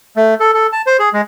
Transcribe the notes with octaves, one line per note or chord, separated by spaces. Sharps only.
A3
A4
A4
A5
C5
G#4
G#3